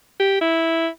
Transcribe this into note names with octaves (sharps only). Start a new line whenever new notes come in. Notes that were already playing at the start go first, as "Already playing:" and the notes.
G4
E4